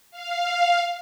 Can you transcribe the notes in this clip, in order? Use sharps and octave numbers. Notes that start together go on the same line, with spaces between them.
F5